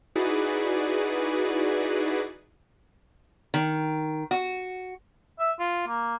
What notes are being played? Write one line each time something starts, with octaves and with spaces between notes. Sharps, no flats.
D#4 E4 F#4 G#4 B4 D5
D#3
F#4
E5
F4
A#3